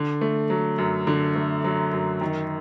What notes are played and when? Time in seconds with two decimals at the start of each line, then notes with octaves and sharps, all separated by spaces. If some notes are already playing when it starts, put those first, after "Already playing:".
Already playing: D3
0.21 A3
0.50 F#3
0.78 F#2
1.07 D3
1.36 A3
1.64 F#3
1.93 F#2
2.21 D#3